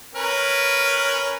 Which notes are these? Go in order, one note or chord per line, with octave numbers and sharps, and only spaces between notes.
C#4 A#4 B4